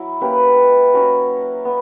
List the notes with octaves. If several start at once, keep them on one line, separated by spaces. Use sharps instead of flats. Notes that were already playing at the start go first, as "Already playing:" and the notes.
Already playing: F#3 E4
A#3 C#4 G4 B4
F#3 C#4 F#4
B3